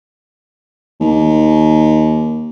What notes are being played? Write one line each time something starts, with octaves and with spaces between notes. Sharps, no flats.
D#2